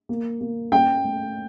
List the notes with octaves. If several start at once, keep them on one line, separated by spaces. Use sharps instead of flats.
A#3
A#3
C#4 G5
A3